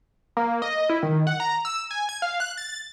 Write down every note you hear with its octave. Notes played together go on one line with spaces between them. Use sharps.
A#3
D#5
E4
D#3
F#5
A#5
E6
G#5
G#6
F5
F#6
A6